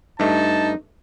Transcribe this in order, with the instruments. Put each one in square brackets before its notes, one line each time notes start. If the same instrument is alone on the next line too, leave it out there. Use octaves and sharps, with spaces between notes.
[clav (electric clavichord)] G2 A3 [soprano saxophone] D#4 [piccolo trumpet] A5